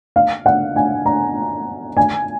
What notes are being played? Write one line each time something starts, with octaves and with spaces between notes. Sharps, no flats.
F5
F#5
G#5
A#5
G#5